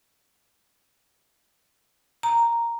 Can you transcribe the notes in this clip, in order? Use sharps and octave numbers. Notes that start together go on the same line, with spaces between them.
A#5